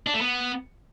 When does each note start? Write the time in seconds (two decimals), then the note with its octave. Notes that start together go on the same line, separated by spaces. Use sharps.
0.07 D4
0.14 A3
0.21 B3